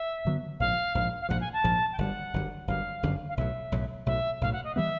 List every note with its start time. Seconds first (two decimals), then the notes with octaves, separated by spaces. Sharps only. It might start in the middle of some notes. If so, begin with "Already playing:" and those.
Already playing: E5
0.25 G2 D3 F#3 B3
0.60 A#1 G#2 F3 F5
0.95 A#1 G#2 F3
1.21 F5
1.29 A#1 G#2 F3 F#5
1.41 G#5
1.53 A5
1.64 A#1 G#2 F3
1.92 G5
1.98 G1 F#2 D3 G3 F#5
2.34 G1 F#2 D3 G3
2.67 G1 F#2 D3 G3 F5
3.03 G1 F#2 D3 G3
3.29 F5
3.37 B1 A2 F#3 E5
3.72 B1 A2 F#3
4.06 B1 A2 F#3 E5
4.41 B1 A2 F#3 F5
4.53 F#5
4.64 D#5
4.75 E3 G3 B3 E5